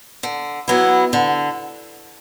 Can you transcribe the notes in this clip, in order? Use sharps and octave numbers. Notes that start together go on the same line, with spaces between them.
D3
F#3 B3 E4
D3